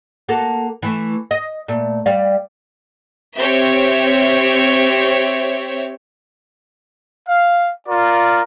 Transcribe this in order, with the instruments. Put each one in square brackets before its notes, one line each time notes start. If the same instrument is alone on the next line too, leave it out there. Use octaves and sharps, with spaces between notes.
[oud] A#3 F#4 A4
E3 A3
D#5
A#2 A3
G3 D5 F5
[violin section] C4 G4 C#5 E5
[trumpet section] F5
F4 A#4 D5